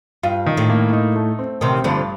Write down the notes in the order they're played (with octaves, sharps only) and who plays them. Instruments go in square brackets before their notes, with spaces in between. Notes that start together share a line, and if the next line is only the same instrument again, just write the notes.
[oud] G2 [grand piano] F4
[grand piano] D#3
[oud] A2
[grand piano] A#3
D#4
A3
C4
[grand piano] A1 [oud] C3 D#3
[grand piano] G2 [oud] D3 F3